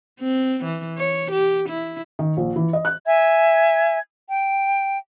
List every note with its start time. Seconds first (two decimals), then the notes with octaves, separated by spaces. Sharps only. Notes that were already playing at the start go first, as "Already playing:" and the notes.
0.20 C4
0.64 E3
0.98 C#5
1.32 G4
1.69 E4
2.19 D#3
2.37 A#1
2.56 E3
2.73 D#5
2.85 F#6
3.06 E5 G#5 G#6
4.29 G5